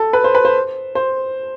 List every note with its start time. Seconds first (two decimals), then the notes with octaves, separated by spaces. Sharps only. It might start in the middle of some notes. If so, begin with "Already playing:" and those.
Already playing: A4
0.13 B4
0.24 C5
0.35 B4
0.45 C5
0.95 C5